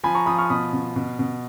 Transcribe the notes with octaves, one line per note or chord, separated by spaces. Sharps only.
F3 G#5 B5
A#5 C#6
F3 B5 D#6
C#6 F6
B2 B5 D#6
B2
B2
B2